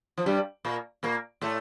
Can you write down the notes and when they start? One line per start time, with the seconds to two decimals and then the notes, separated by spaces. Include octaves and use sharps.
0.18 F3
0.26 G2 G3
0.65 A#2 A#3
1.03 A#2 A#3
1.41 A2 A3